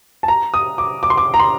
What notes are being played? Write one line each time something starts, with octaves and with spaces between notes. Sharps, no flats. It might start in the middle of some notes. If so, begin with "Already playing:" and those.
A5
A#5
D#6
D6
D6
C6
D6
A#5
C6